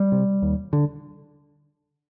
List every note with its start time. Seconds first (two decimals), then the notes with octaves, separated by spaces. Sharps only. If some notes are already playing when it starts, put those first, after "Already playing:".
Already playing: G3
0.12 C3
0.42 D#2
0.73 D3